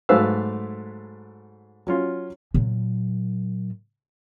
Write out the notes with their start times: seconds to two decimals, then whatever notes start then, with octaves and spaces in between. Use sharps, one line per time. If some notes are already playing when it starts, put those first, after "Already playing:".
0.09 G#2 F#3 A3 B4 F5 E6
1.87 F#3 C#4 F4
2.54 A#2 F#3